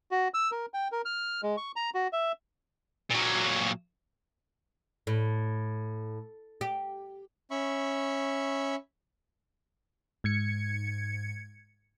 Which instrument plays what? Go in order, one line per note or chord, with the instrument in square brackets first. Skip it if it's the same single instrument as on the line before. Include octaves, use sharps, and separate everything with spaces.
[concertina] F#4
E6
A#4
G5
A#4
F6
G#3
C#6
A#5
F#4
E5
[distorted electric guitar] A#2 F#3
[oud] A2
G4
[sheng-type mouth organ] C#4 E5 B5 C#6
[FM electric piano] G#2 G#6 C#7